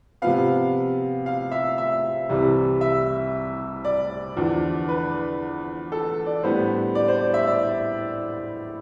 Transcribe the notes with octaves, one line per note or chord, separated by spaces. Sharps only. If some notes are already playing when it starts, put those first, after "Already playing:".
C3 F3 B3 F5
F5
E5
E5
C2 C3 E3 G3
E5
D5
E2 D3 F3
B4
A4
D5
A2 G3 B3 D4 C5
D5
C5
D5
E5
D5